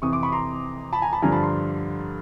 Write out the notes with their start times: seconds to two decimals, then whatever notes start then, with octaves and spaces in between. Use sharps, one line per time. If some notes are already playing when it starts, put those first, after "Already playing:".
0.02 F2 C3 E3 C#6 D#6
0.12 C6 D6
0.23 B5 C#6
0.32 A#5 C6
0.93 A5 B5
1.02 G#5 A#5
1.13 A5 B5
1.22 G2 D3 F3 G#5 A#5
1.32 A5 B5
1.43 A#5 C6